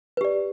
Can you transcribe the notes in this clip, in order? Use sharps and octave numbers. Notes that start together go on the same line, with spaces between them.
G4 B4 D5